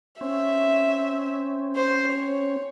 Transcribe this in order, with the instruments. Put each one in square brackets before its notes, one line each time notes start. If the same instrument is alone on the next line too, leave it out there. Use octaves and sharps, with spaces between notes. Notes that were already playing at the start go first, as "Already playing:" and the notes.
[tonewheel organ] C4 C#4 [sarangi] E5
[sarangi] C5
C#5